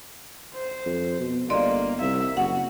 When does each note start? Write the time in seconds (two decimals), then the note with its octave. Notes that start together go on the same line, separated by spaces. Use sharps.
0.54 C5
0.86 F2
1.20 B2
1.50 G1 A#3 D5 D#5 C6
2.01 C2 E5
2.37 F#1 F#4 F#5